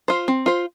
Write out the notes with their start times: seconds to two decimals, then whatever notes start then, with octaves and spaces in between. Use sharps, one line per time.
0.08 F4 C5
0.28 C4
0.46 F4 C5